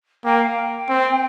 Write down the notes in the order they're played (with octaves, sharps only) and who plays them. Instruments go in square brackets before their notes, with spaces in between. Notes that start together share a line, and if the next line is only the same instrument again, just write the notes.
[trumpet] A#3 [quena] G5
[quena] F5
G5
[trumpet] C4